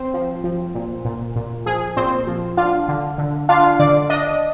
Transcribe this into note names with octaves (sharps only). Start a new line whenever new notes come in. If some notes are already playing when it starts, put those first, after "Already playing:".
Already playing: C4 C5
F3
F3
A#2
A#2
A#2
F3 G#4
A#2 C4 C5
F3
D4 F4 F5
D3
D3
D4 F4 F5
D3 D5 D6
D4 D#5 D#6